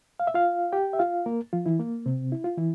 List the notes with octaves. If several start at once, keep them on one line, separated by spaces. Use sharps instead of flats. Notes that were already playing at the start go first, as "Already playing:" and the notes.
F5
E5
F4 F5
G4 G5
E5
F4 F5
A#3 A#4
F3 F4
E3 E4
A#3
C3 C4
E4
F4
E3 E4